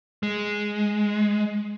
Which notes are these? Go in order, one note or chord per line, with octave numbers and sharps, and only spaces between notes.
G#3